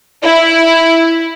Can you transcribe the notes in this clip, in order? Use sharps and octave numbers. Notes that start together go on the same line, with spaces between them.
E4